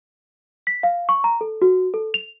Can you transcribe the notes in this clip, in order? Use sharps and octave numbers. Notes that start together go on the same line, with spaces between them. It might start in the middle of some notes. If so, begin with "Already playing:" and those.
B6
F5
C#6
A#5
A4
F#4
A4
F7